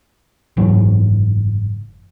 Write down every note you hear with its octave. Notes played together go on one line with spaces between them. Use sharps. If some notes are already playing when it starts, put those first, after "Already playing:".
F#1 G#2 E3 F#3